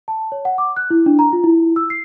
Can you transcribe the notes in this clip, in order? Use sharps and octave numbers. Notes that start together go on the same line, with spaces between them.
A5
C#5
F#5
D6
F#6
E4
D4
A#5
F4
E4
E6
C7